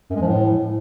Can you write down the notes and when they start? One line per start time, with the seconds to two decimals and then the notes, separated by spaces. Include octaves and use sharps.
0.10 F#2
0.16 G#3
0.21 F3
0.27 A2